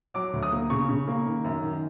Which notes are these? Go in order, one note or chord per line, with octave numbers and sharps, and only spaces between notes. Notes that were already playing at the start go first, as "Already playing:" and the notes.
F#3 D6
D2
D#6
A#3
C#3 C#6
C#3
A#3
D#3
F#2
D#3